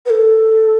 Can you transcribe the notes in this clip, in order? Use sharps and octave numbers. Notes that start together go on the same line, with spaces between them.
B4
A4